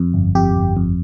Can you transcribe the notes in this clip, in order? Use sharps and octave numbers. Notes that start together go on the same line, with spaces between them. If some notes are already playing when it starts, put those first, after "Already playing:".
Already playing: F2
G1
F2 G4
G1
F2